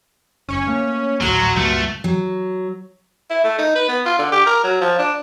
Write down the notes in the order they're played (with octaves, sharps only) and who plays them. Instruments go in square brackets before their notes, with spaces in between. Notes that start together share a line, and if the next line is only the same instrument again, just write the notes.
[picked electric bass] F#1 [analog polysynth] C#4 C#5
[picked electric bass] A3 A#3
[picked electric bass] G#1 D2 A2 [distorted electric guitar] F#3 [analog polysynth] F#4 C6 F6
[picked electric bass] C#2 G2 A#2 [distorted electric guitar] A3
[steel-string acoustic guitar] F#3
[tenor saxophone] E4
A3
D#4
B4
B3
F4
D3
G4
A#4
F#3
F3
D4